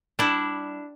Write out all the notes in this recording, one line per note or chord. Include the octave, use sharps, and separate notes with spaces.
G3 D4 E4